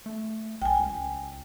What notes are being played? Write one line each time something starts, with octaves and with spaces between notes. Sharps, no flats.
A3
B1 G5 G#5
C#2